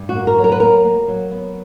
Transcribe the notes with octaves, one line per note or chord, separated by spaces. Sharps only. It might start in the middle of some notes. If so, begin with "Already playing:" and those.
Already playing: G2
F#4
A#3
A#4
F#3
A#4
B4
A#3 A#4
A#3
F#3
B3